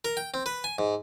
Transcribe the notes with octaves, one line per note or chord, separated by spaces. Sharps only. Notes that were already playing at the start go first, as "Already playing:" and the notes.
A#4
G5
C4
B4
G#5
G#2